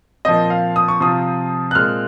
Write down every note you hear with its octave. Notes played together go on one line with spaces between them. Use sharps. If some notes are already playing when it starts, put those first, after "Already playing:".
A#2 F3 C4 D#5
F5
D#6
C#6
C3 F3 C4 F4 D#6
F#6
A#2 G#3 C4 F6